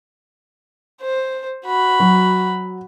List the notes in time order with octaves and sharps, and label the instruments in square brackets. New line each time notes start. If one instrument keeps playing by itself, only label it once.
[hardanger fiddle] C5
F#4 B5
[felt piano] F#3